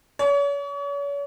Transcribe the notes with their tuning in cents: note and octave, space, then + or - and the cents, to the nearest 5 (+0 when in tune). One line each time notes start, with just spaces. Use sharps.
C#5 +40